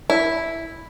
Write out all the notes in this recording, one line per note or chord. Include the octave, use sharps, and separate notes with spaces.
E4